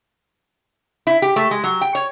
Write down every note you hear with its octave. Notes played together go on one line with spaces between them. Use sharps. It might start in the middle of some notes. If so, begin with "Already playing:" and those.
E4
G4
A3
G#3
F#3
G5
C#5